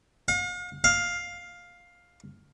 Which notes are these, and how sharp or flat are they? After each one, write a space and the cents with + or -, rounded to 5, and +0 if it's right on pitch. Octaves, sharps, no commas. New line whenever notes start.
F5 +45
F5 +10